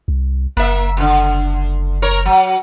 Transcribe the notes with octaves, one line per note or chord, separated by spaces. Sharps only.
C2
F#1 A#3 E5
F2 D3
A#4 C#5
F#3